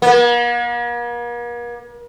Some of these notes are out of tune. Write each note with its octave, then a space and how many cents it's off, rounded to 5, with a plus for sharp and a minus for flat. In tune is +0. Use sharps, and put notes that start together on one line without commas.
A#3 +45